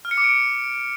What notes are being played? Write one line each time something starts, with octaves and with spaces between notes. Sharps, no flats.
F6
C#7
D6
D7